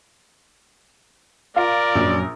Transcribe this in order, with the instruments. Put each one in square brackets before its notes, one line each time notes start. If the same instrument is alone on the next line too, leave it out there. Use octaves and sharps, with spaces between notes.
[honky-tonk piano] F4 [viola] A#4 [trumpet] D5
[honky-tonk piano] A#1 [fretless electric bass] F#2 F#3